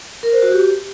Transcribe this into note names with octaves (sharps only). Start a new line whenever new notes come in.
A#4
C5
F#4
G4